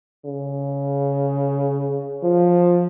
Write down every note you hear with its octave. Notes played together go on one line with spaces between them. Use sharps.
C#3
F3